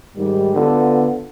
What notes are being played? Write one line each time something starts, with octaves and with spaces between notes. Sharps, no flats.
G#2 D#3 G3
D3 B3 F4